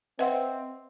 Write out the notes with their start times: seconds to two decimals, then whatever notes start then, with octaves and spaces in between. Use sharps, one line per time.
0.19 C4 B4 D#5 E5 F#5